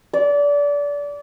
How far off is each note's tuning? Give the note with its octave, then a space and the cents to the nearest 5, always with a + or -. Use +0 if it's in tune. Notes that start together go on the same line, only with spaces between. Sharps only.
D5 -25